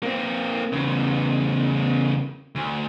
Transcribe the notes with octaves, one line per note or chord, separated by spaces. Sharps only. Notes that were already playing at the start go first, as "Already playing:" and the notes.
A#3 C4
E2 C#3
D2